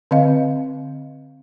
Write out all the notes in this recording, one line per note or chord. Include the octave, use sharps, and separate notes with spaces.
D3 C4 D#5 F5